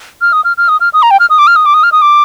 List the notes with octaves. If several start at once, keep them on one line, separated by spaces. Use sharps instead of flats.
F6
D#6
F6
F6
D#6
F6
D#6
A#5
G5
F6
D#6
D6
F6
D#6
D6
D#6
F6
D#6
D6